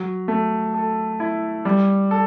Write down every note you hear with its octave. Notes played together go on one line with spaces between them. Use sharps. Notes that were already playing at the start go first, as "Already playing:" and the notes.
Already playing: F#3
A3
A4
E4
G3
A4